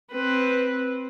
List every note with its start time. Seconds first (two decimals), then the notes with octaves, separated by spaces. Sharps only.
0.12 C4 B4